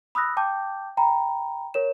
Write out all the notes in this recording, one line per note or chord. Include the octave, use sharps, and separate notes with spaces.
B5 D#6 E6 F#6 A#6
G5 A5 D6 G6
G5 A#5 B5
A#4 C#5 E7